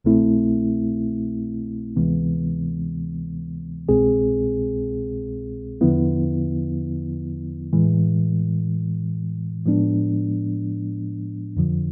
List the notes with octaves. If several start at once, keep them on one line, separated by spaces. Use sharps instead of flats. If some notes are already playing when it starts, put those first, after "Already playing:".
C2 B2 A3 C4 E4
D2 C3 E3 G#3 B3
C2 B2 G#3 C4 G#4
E2 D3 F3 B3 E4
A2 E3 G#3
A2 F3 G#3 B3 D4
F2 D3 F3